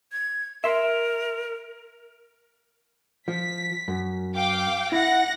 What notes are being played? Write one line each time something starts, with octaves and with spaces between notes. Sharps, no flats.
G#6
A#4 E5 C6
F3 B6
F#2
F5 G5 D6
E4 F#5 A#6